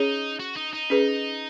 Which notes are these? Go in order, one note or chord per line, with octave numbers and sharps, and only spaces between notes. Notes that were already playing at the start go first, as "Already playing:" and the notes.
Already playing: C#4 D#4 G#4 C#5
F#4
D#4
D#4
C#4 G#4 B4